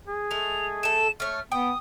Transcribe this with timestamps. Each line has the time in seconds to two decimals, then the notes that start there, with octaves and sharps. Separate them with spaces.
0.08 G#4
0.31 G#3 A3 F7
0.83 A3 A4 E7
1.20 A3 C#5 F6
1.52 B3 G5 D#6